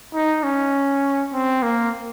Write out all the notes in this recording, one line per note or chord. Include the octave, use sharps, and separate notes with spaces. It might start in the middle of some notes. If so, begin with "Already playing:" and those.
D#4
C#4
C4
A#3